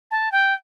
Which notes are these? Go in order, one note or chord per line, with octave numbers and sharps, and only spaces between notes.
A5
G5